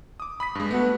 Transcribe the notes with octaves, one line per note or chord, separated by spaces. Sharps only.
D6 D#6
B5 D#6 B6
G2 G#3
A3 B3 F#4